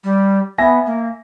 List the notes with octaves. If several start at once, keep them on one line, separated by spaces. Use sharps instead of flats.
G3
B3 E5 G#5 A#6
A#3